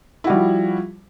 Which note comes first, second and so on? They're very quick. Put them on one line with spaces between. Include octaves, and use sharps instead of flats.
E4 F#4 G3 F3